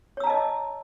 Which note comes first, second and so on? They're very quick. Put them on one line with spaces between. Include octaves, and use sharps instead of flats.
C#5 E6 A#5 A5 D#5